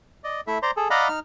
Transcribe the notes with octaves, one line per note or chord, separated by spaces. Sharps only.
D5 D#5
A3 E4 E5
C5 D5 A#5 C6
G#4 A4
D5 D#5 F5 F#5 A#5 B5
D#4 F6